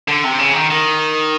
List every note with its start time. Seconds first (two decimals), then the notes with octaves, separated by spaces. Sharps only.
0.08 D3
0.24 C3
0.39 C#3
0.54 D#3
0.71 D#3